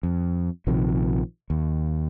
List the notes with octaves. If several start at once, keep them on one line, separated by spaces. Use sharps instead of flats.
F2
A#1 C3 D#3 F3
D#2